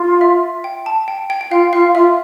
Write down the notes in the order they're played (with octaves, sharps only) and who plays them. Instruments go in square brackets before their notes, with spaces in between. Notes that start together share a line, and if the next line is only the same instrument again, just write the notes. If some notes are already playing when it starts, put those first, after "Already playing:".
Already playing: [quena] F4
[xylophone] E5
G5
A5
G5
G5
G5
[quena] F4 [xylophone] F5
[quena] F4 [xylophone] F5
[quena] F4 [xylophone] E5